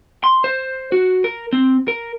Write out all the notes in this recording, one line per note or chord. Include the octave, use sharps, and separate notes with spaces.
C6
C5
F#4
A#4
C4
A#4